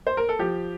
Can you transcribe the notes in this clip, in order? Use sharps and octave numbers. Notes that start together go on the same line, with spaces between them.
C5
A#4
A4
F3 G4